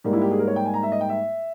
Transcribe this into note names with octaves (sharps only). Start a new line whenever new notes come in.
G#2 G3 A#3 G4
E4
G4
G#4
A#4
C#5
G5
G#5
A#5
E5
D#5
G5
E5